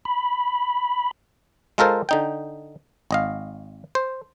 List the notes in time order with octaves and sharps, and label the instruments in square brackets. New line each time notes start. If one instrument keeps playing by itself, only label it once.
[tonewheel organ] B5
[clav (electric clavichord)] G#3 F4 A4 A#4 C5
D3 D#4 G5
G#1 D#5 F5
C5